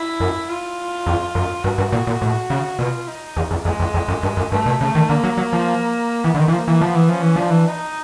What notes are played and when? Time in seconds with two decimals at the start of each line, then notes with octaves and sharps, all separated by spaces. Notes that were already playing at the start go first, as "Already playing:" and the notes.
Already playing: E4
0.20 F#2
0.49 F4
1.06 F2
1.35 F#2
1.63 G2 F#4
1.78 G2
1.92 A#2
2.07 A#2
2.22 A2
2.50 C#3
2.79 B2 F4
3.07 D#4
3.36 E2
3.51 F2
3.65 F2 G#3
3.80 F2
3.94 F2
4.08 F#2
4.23 G2
4.37 F#2
4.51 G2 A3
4.66 B2
4.81 C#3 A3
4.95 D#3
5.09 D3 A#3
5.24 F#3
5.37 F#3
5.53 F3
6.24 E3 B3
6.34 D3
6.39 D#3
6.48 E3
6.53 F3 A#3
6.68 E3
6.81 F3 B3
6.95 E3
7.09 F3 C#4
7.22 E3
7.36 F3 D4
7.50 E3
7.68 D#4